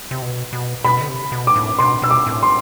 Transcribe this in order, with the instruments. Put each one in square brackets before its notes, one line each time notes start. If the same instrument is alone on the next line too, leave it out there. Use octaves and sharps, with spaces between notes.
[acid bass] C3
B2
B2
[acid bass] B2 [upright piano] B5
[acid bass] D3
C3
B2
[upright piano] D6
[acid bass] A2
[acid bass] B2 [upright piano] C6
[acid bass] B2 [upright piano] E6
[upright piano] D6
[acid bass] A2
[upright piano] C6